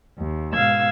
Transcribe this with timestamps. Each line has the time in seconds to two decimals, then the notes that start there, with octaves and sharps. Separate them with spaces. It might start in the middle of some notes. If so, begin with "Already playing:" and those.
0.18 D#2
0.53 G#2 B2 F5 E6 G#6